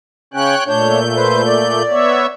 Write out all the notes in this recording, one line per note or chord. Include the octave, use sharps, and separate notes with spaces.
C#3 C#4 C#5 G5 F#6
A#2 A3 D4 C#5 G6
B4 C5
D5
B3 C#5 E5